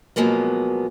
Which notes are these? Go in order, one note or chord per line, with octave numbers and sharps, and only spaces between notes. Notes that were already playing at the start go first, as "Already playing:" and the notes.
B2 F3 F#3 G#3 A#3 B3